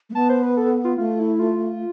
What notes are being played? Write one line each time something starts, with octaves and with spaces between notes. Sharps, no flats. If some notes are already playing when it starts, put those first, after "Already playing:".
A3
B3 A5
C5
B4
A4
F4
A3 F4
E4
F4